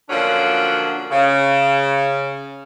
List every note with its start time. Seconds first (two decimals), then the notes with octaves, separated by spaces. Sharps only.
0.09 D3 F3 F#3 A#3 C#4 D4
1.11 C#3